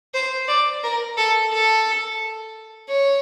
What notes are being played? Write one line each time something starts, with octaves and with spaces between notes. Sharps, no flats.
C5
D5
A#4
A4
A4
C#5